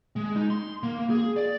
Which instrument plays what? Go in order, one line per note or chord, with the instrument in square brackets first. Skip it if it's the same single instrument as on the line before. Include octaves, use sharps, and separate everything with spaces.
[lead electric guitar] G#3
D#4
C6
A#3
G#4
D5